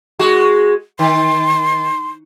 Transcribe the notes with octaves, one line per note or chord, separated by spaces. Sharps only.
G#3 F#4
D#3 C6